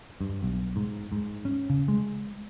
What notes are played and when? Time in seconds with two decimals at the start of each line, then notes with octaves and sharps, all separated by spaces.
0.21 G2
0.43 B1
0.76 G#2
1.12 G#2
1.45 C#4
1.70 C#3
1.88 G#3